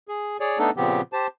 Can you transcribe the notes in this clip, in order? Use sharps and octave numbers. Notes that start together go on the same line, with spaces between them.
G#4
G#4 C#5 D5
A3 B3 D4 D#4 A4
A#2 C#3 F3 B3 C4 G4
G4 C5 A5